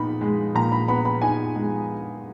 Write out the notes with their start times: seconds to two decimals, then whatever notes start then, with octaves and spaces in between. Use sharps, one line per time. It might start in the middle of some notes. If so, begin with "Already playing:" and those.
Already playing: A#2 B3 D#4 B5
0.21 G#3
0.55 A#2 A#5
0.72 B5
0.88 B3 B5
1.05 B5
1.22 D#4 G#5
1.56 G#3